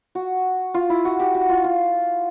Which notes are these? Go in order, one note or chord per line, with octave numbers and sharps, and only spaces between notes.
F#4
F4
E4
F#4
G4
F#4
F4
F4